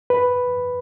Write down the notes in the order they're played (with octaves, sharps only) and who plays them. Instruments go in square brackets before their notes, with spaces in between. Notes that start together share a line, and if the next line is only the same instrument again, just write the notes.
[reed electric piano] B4